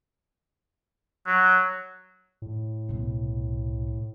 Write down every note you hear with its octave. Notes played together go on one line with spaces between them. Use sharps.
F#3
A2
C2 B2